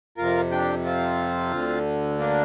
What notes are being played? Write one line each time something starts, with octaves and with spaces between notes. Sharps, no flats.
F2 C3 F4 A#4
D4 G4
C4 F4
D2 D3
A#3 D4